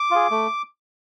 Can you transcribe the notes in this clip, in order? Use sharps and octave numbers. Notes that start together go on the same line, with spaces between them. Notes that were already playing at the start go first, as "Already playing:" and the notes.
Already playing: D6
F4 G#4
A3